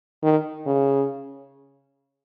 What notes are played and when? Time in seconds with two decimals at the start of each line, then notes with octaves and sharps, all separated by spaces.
0.23 D#3
0.66 C#3